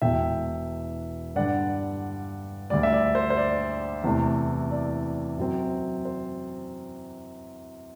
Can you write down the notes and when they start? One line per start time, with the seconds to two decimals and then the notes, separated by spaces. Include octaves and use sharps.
0.02 E1 E2 B2 E5 G5
1.35 G2 D3 G3 D4 D5 F#5
2.70 D2 D3 G3 D5
2.83 E5
2.93 D5
3.15 C5
3.30 C5
3.37 D5
4.04 E2 C3 E3 A3
4.71 D5
5.38 F#2 F#3 C4
6.05 C5